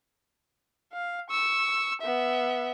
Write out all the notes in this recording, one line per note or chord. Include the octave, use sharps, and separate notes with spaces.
F5
C#6 E6
B3 E5